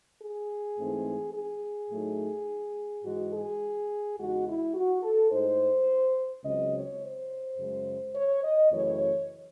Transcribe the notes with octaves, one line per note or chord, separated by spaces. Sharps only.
G#4
G#2 E3 A3 C4 D#4
G#4
A2 F#3 A3 D#4
G#2 E3 G#3 F#4
G#4
E2 C#3 G#3 D#4 F#4
E4
F#4
A4
A2 G#3 D#4 C5
C#2 C#3 F#3 C4 D#5
C#5
C5
F#2 C#3 G#3
C#5
D#5
F#2 C#3 E3 A3 C#5